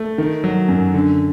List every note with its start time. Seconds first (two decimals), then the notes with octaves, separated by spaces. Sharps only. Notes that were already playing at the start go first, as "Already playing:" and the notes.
Already playing: A3
0.18 D#3
0.44 F#3
0.68 F#2
0.94 D3